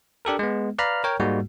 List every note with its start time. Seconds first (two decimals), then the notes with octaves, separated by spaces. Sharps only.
0.25 D4 G4 A4 A#4
0.39 G#3 B3
0.78 B4 D5 F5 A#5 B5 F6
1.04 A#4 C#5 G5
1.20 G#2 G3 G#3 A#3 F#4